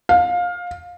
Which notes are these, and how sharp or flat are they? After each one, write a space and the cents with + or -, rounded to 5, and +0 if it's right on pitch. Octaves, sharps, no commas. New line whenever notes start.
F5 +20